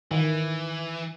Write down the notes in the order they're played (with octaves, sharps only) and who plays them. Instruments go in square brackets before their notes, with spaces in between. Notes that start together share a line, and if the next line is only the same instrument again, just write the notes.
[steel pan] D#3 [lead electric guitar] E3